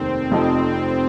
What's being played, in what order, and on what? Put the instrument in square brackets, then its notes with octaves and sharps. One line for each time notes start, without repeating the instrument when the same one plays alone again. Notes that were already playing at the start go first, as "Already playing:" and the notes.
Already playing: [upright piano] F1 D#2 D#3 D#4 [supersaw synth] C4
[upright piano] F1 F2 F3 D#4 [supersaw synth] C4